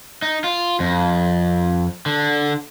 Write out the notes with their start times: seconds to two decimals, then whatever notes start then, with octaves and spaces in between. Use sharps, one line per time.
0.22 D#4
0.44 F4
0.80 F2
2.06 D3